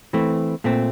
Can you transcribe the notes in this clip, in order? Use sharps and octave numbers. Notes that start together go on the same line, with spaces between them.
E3 A3 C4
A#2 A3 C4